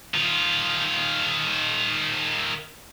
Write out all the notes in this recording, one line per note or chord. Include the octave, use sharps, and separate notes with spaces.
D#3 F4